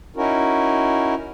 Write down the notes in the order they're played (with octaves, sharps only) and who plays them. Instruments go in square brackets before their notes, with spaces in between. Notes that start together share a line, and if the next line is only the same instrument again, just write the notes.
[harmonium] C#4 D#4 E4 F#4 A#4